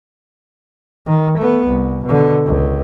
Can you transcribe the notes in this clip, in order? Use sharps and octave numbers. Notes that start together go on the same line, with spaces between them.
D#3
A3 B3
C2
B2 D3
C#2